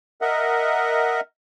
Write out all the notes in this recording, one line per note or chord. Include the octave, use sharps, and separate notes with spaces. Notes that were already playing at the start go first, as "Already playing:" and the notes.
A#4 D#5 E5 F#5